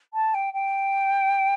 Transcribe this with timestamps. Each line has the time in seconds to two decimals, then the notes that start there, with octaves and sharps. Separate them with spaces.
0.14 A5
0.34 G5
0.53 G5